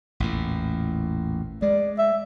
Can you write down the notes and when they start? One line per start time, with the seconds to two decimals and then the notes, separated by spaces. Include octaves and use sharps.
0.20 A1 E2 A#2
1.62 G#3 D5
1.98 E5